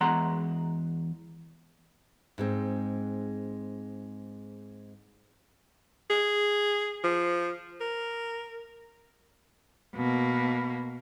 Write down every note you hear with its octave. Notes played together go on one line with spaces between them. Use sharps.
E2 G#3 F#5 A#5 C6
G#2 G#3 C4
G#4
F3
A#4
B2 A#3